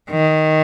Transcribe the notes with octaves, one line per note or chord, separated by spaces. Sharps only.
D#3